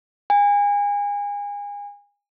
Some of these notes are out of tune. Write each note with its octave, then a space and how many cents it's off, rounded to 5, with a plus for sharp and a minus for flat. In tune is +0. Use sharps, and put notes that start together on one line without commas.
G#5 -30